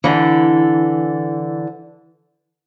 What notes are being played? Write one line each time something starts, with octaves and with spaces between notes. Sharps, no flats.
D3 E3